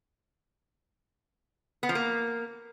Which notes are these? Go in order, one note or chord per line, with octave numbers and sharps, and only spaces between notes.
B3
F3
A#3